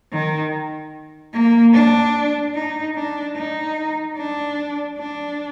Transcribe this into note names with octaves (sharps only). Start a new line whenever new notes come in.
D#3
A#3
D4
D#4
D4
D#4
D4
D4